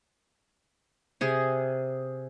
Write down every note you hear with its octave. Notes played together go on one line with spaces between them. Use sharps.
C3 G#4